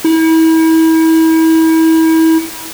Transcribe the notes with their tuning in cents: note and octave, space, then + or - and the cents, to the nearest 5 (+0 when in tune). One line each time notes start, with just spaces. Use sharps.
E4 -35